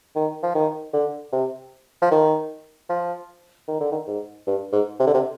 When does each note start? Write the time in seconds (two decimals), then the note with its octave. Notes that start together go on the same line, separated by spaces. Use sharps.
0.15 D#3
0.43 F3
0.55 D#3
0.94 D3
1.32 C3
2.02 F3
2.11 D#3
2.89 F3
3.68 D#3
3.80 D3
3.92 D#3
4.08 G#2
4.47 G2
4.72 G#2
4.99 C3
5.07 D3
5.14 C3